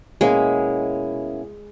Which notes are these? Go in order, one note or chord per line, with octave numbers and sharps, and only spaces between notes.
B2 G#3 A#3 C#4 E4